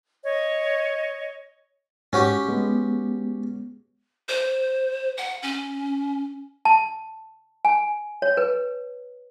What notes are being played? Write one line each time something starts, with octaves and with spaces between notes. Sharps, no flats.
C#5 D#5
G#2 C#4 F#4 G4
G#3 B3
C5
F#5
C#4
A5
G#5
C#5
B4